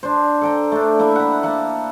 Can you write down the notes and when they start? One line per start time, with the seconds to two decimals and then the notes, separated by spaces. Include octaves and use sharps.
0.03 D4 C5
0.41 A4 G5 A#5
0.72 A3 D4
0.99 A#3 E4 E5
1.16 F#5 B5
1.43 A#3 F#5 A5